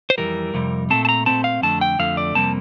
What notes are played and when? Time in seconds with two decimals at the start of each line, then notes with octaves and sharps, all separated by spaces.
0.10 C5
0.18 F2 C3 E3 G3 A#4
0.54 F2 C3 G3
0.90 A#2 A3 C4 A5
1.05 A5
1.09 A#5
1.26 A#2 A3 C4 A5
1.44 F5
1.62 F2 D3 A3 A5
1.81 G5
1.99 F2 D3 A3 F5
2.17 D5
2.35 F2 C3 G3 A#3 A5